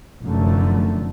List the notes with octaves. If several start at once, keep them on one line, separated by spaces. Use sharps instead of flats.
F1 F#2 D3 A3